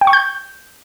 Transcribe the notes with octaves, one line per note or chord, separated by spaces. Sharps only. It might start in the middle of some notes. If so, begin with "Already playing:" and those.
G5
C#6
G6